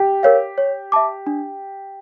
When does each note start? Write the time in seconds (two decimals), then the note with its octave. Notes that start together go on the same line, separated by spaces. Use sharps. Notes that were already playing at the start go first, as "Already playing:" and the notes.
Already playing: G4
0.23 A#4 C#5 F5
0.58 C#5
0.92 E5 A5 D6
1.27 D4